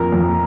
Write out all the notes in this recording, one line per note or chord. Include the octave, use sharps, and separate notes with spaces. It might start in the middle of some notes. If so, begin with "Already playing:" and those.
Already playing: F2 A#2 A#4
F2